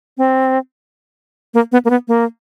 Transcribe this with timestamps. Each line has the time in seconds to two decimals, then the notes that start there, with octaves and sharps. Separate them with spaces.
0.18 C4
1.54 A#3
1.72 B3
1.85 A#3
1.90 B3
2.08 A#3